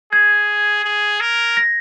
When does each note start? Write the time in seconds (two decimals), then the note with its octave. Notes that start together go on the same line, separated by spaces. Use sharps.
0.12 G#4 G#6
0.84 G#4
1.20 A#4
1.57 A#6